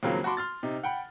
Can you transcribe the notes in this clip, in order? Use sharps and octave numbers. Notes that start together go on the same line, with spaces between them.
D#2 C#3 F3 F#3 A#3 C4
F#4 A5 B5 C6 D6
C6 F6 A6
C3 D#4
F#5 G5 B5